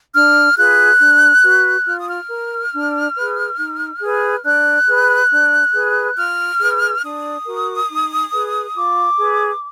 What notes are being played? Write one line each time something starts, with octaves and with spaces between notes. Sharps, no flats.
D4 F6
F4 G#4 B4 F#6
D4
F#4 B4
F4 F6
D#6
F6
A#4
D4
G#4 B4
D#4
G#4 B4
D4 F#6
G#4 B4
D4
G#4 B4
F4 F6
G#4 B4
D4 D#6
F#4 A#4
D#4
G#4 B4
F4 D6
G#4 B4